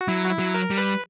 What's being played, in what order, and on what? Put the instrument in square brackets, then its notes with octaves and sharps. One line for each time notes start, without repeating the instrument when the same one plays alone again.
[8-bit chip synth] F#4
[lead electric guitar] F#3 [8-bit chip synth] E4
[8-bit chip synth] F#4
E4
[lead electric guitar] F#3
[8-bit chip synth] A#4
[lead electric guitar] G3
[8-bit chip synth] B4